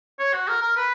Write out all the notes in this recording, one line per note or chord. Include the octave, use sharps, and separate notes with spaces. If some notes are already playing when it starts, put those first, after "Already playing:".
C#5
F#4
A#4
A#4
B4